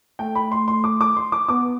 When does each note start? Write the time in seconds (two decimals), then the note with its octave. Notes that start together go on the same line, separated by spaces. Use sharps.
0.19 A3 G5
0.35 B5
0.52 C6
0.68 C6
0.84 D6
1.01 D6
1.17 C6
1.32 D6
1.48 B3 D6